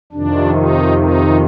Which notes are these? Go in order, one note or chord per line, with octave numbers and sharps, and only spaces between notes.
F2 C3 D#3 D4
D#4
D#4